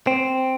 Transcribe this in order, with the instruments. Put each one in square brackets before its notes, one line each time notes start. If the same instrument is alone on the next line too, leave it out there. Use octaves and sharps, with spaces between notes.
[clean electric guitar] C4